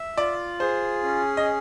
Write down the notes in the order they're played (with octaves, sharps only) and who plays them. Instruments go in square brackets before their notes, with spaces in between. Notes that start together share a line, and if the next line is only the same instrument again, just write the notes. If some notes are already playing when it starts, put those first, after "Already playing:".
Already playing: [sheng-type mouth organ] E5
[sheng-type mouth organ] F4 [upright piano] D5
[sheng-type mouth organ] G#4 [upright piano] C5
[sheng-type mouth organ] C#4
[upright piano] D#5